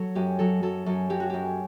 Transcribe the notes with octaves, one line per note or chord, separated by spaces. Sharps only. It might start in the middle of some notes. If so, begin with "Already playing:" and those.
Already playing: F#3 A4
F#2 G4
F#3 A4
F#3 A4
F#2 A4
F#3 G4
F#4
F#2 G4